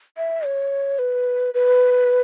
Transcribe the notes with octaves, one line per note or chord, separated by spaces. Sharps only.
E5
C#5
B4
B4